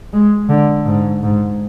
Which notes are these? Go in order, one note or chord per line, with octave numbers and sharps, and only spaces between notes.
G#3
D3
G#2
G#2